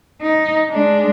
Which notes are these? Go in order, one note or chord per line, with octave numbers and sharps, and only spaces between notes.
D#4
G#3 D4